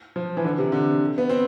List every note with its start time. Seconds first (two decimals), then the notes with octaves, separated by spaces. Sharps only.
0.16 F3
0.37 E3
0.44 D3
0.58 C3
0.72 D3
1.18 B3
1.29 C4